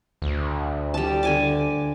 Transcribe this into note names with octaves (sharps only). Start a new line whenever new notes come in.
D2
G3 A5
D3 G#5 D6